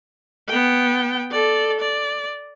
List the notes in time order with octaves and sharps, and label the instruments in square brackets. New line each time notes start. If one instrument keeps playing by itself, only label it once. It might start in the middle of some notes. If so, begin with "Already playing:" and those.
[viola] B3 G5
A4 D5
D5